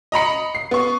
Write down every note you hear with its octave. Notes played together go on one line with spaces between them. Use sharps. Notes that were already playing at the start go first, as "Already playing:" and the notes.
D#5 A#5 B5 C#7
C7
B3 C#6